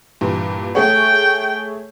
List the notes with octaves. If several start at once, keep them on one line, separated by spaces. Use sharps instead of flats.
G2 A#2 E3
A3 G#4 C#5 G5